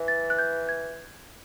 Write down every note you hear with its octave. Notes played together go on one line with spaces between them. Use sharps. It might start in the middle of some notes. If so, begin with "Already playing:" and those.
Already playing: E3
A6
F#6
G6
G#6